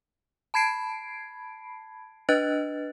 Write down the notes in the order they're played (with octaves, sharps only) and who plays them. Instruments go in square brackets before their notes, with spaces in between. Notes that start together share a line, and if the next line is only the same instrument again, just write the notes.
[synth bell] A5 B5 G#6 C7 D7
D4 B4 D#5 F#6 A6